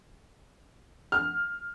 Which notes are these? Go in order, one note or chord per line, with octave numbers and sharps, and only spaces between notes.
F6